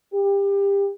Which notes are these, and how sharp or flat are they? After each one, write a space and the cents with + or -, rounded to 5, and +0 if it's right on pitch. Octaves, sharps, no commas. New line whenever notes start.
G4 +25